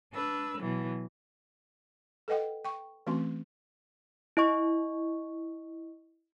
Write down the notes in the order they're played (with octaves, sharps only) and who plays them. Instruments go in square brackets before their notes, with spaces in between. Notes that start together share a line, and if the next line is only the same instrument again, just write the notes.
[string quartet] D4 B4 E6
B2 E3 F#3
[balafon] A4 B4 D#5 F#5 G5
G5 C#6
E3 A3 C4 C#4 F#4 C6
[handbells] E4 D#5 C#6